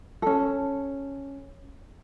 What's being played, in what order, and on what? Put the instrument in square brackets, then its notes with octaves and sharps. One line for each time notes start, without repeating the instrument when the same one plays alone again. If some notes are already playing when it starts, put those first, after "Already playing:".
[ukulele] C#4 A4